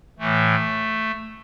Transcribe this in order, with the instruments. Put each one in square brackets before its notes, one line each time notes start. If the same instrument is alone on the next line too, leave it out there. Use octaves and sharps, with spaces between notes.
[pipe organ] A2 E3 A3